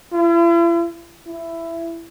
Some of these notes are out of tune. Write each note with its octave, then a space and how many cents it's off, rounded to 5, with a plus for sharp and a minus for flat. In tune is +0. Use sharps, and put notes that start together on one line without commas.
E4 +45
E4 +15